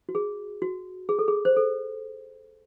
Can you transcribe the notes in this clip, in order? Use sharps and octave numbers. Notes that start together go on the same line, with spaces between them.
F#4
G#4
F#4
G#4
A4
G#4
C5
A4